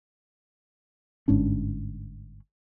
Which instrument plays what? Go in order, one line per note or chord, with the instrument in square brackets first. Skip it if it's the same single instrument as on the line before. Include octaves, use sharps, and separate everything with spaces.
[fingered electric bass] G1 G#2 C#4 D4